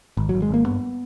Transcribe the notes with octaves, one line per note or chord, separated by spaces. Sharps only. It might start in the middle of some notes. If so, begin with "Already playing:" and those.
G#1
G#1 F#3
G#3
G#1 A#3
G2 B3